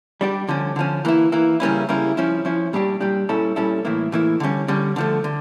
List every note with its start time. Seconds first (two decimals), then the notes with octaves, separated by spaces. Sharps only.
0.21 G3 D4 G4
0.48 D3 F3 C#4
0.76 D3 F3 C#4
1.05 E3 A#3 E4
1.32 E3 A#3 E4
1.60 C#3 G3 A#3 C#4 E4
1.89 C#3 G3 A#3 C#4 E4
2.17 F3 C#4 E4
2.45 F3 C#4 E4
2.73 A#2 G3 D4 G4
3.00 A#2 G3 D4 G4
3.29 A#2 G3 C#4 E4 A4
3.56 A#2 G3 C#4 E4 A4
3.85 A2 E3 A#3 E4
4.12 A2 E3 A#3 E4
4.40 D3 G3 C#4
4.68 D3 G3 C#4
4.96 D3 F3 A3
5.24 D3